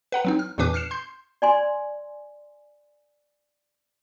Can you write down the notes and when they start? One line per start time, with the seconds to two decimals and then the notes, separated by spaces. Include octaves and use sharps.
0.12 B4 F#5 A#5
0.25 F#3 C4 D#4
0.39 F6
0.58 E2 A#2 E3 D4 B4 D6
0.74 F6 F#6 C7 C#7 E7
0.91 C6 G6 C7
1.42 D5 G#5 C6